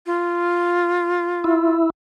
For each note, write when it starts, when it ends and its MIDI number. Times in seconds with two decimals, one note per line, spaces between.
0.06 1.75 65
1.44 1.90 64